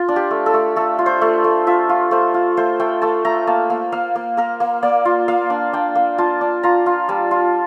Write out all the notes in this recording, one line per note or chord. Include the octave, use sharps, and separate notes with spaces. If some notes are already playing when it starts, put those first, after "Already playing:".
Already playing: F4
D4
G4
A3
A4
A3
A3 A4
F4
C5
A3
A3
F4 E5
F4
A3 C5
F4
A3 C5
A3 G5
A3 A5
A3 A#5
A#3 A5
A#3
A#3 F5
A#3
A#3 A#4
A#3
A#3 D5
F4
A#3 F5
D4
D4 G5
A#3
F4 A5
D4
F4 A#5
F4
G3 A5
F4